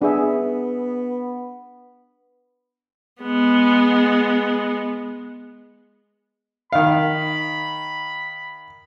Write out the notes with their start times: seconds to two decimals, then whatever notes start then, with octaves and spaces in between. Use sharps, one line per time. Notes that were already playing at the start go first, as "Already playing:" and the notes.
0.02 B3 D4 G#4 E5
3.22 G#3 B3
6.72 D#3 F5 B5